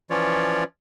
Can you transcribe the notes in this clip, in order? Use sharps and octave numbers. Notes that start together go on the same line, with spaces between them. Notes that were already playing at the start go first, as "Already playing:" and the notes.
E3 F3 C#4 F4 C#5 D5